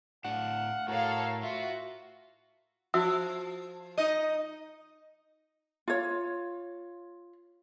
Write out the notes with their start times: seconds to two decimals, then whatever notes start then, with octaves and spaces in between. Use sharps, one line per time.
0.25 A2 D4 F5 F#5
0.88 A2 F#4 A4 A#4 C#5 F5
1.43 F4 F#4 E5
2.94 F3 F#4 E5 E6
3.98 D#4 D#5
5.88 F4 C#5